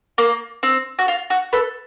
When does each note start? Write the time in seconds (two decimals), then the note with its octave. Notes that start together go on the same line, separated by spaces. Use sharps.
0.18 A#3
0.63 C4
0.99 F#4
1.08 F4
1.30 F#4
1.53 A4 B4